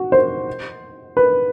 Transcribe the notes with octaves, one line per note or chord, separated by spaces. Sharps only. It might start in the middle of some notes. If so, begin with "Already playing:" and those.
Already playing: F#4
C5
B4